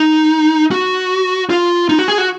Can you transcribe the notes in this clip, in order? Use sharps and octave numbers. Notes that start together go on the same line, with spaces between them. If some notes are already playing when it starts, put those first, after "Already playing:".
Already playing: D#4
F#4
F4
D#4
F#4
G#4
F#4